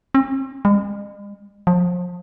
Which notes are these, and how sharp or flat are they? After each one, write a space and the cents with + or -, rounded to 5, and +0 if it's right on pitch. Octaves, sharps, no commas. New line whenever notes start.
C4 +45
G#3 -45
F3 +30